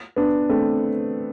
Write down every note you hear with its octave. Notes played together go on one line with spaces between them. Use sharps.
B3 D4
A3 C4